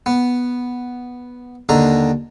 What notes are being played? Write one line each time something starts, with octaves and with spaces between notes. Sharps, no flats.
B3
D#2 D3 D#5 A#5